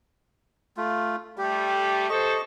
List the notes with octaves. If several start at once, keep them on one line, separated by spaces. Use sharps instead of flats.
A3 F4
G3 A3 G4
A4 C5 D#5 C#6